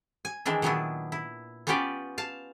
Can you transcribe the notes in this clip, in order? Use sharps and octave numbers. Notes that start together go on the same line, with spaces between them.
G#5
D#3 E3 G#3 D4 E4
A#2 D#3 F#3 B3 D4 E4
E4
B3 C#4 F4 G4 B4 D5
F5 A5